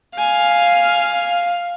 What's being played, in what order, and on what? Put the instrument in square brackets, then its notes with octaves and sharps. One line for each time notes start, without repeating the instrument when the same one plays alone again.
[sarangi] F5 [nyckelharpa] G#5